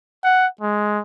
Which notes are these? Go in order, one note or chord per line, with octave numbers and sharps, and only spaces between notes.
F#5
G#3